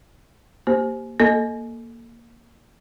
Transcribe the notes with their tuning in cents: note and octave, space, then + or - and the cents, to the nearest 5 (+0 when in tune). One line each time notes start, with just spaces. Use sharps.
A#3 +0 G4 +0 C5 +0
A#3 +0 A4 +0 D#5 +0